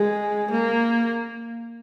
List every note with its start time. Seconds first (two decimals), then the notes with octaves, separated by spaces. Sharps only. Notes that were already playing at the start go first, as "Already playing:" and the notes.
Already playing: G#3
0.51 A#3